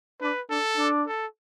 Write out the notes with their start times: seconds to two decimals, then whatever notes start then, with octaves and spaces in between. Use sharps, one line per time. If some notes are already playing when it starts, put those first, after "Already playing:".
0.21 D4 B4
0.50 D4 A4
0.77 D4
1.06 A4